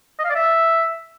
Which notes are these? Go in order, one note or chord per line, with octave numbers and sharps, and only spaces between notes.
D#5
F5
D5
E5